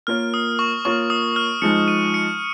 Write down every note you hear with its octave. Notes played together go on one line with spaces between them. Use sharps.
A#3 F4 A#4 C#5 F6
D#6
C#6
A#3 F4 A#4 C#5 C#6
D#6
F6
F3 G#3 D#4 C#7
D#7
C#7